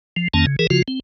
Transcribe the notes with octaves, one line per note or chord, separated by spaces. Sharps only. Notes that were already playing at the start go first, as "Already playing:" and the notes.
F3
F2 D#3 A#3 C#4 A5
C#3
E3 G#4 A#4
C#3 F3 F4 F#4
C4